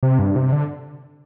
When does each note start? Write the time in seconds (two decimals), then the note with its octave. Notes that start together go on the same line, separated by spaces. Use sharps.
0.03 C3
0.19 G2
0.36 C3
0.52 D3